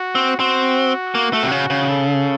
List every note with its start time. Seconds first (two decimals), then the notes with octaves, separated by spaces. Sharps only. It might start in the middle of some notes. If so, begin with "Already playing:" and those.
Already playing: F#4
0.15 C4
0.40 C4 F#4
1.15 A#3
1.33 A3
1.43 C3
1.52 C#3
1.70 C#3
1.89 A4